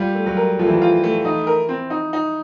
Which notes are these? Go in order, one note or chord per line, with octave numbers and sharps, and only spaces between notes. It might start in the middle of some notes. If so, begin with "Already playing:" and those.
Already playing: G3 F4
A3
F#3
A#4
F3 A3
E3
F3
F4
A3
E3 D#4
A#4
C4
D#4
D#4